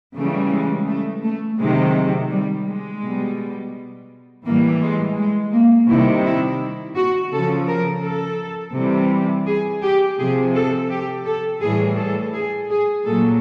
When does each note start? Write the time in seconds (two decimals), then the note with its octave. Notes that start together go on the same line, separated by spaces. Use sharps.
0.16 C#3 E3 G3 A3
0.51 G#3
0.87 A3
1.23 A3
1.59 C3 D#3 F#3 G#3
2.31 G3
2.67 G#3
3.02 B2 G3
4.45 A2 E3 G3 A#3
4.82 G#3
5.18 G#3
5.52 A#3
5.89 C3 D#3 G3 E4
6.24 E4
6.96 F#4
7.32 C#3 F3 A4
7.67 A#4
8.03 A4
8.75 C3 E3 G3
9.47 G#4
9.82 G4
10.18 C3 F3 G#4
10.55 A4
10.90 G4
11.26 A4
11.61 A2 E3 G3 G#4
11.98 A4
12.33 G#4
12.70 G#4
13.05 A#2 F#3 A4